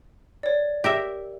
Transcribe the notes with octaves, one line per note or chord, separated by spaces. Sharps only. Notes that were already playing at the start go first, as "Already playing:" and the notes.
C#5 D5
G4 A#4 E5